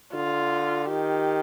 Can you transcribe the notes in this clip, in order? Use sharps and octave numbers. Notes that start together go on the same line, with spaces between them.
D3 F4
D#3 G4